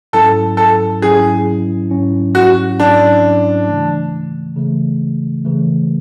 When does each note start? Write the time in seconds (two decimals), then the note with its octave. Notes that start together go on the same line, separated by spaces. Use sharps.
0.13 G#2 F#3 C#4 E4 A4
0.57 A4
1.02 G#2 F#3 C#4 E4 G#4
1.90 G#2 F#3 C#4 E4
2.35 F#4
2.79 G#2 F#3 C#4 D4 E4
3.68 C#3 E3 A3
4.56 C#3 E3 A3
5.45 C#3 E3 A3